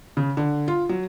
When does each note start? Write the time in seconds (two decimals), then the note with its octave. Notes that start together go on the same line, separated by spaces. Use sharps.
0.17 C#3
0.37 D3
0.68 F4
0.89 F#3